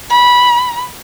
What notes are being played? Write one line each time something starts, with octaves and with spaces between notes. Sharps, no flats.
B5